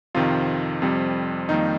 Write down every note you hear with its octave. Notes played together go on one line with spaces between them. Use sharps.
F2 C3 D#3 F4
F2 C3 G3
F2 D#3 G3 A#3 D#4